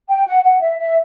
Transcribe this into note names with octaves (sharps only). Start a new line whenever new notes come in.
G5
F#5
F#5
E5
E5